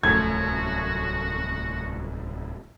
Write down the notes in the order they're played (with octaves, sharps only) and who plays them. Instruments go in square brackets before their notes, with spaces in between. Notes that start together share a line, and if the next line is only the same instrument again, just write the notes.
[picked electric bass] D1 C2 [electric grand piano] F#2 F3 A3 [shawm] F#4 [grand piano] G#6